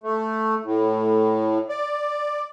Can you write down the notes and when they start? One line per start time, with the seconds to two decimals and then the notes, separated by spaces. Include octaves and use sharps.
0.03 A3
0.64 A2
1.69 D5